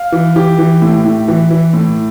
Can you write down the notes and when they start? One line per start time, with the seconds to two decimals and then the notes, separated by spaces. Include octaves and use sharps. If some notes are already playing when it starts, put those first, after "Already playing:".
Already playing: F5
0.12 E3
0.36 E3 G4
0.59 E3
0.82 A2
1.04 A2
1.28 E3
1.51 E3
1.73 A2